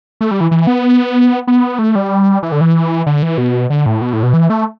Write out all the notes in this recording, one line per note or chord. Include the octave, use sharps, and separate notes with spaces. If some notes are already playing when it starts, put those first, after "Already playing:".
A3
G3
E3
E3
B3
B3
A3
G3
E3
D3
E3
D3
E3
B2
D3
A2
B2
A2
B2
E3
A3